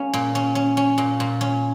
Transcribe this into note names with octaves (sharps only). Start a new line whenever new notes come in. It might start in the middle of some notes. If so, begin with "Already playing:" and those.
Already playing: A#3 C#4 G#4
A#2
C#4
C#4
C#4
A#2
A#2
C#4